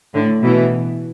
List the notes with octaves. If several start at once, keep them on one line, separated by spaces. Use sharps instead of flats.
A2 D3
B2 E3